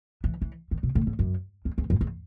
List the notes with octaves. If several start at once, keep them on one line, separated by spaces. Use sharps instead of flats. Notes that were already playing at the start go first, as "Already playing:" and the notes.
E3
E3
D#3
B2
A2
G#2
F#2
E2
E2
F#2
E2